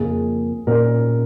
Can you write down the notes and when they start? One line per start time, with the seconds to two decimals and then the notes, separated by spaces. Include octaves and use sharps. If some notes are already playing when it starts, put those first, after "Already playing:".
Already playing: F2 C#3 A#3 G#4
0.67 A#2 A#3 C#4 A#4